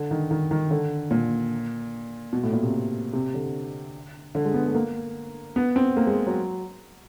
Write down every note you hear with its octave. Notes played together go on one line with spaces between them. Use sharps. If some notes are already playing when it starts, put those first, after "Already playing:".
Already playing: D3
D#3
D#3
D#3
D3
A#2
B2
A2
A#2
C3
C3
D3
D3
G#3
B3
A3
A#3
B3
C4
A#3
G#3
F#3